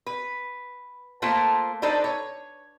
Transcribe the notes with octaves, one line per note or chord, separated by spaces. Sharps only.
B4
A3 A#3 F4 A4 C5
D4 D#4 A4 B4 C5 D5
C#5